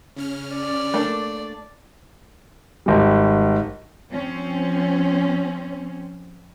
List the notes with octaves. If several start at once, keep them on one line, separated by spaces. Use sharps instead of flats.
C#3 C#4 F6
D5
A3 A#3 D4
G#1 G3
F3 C4 C#4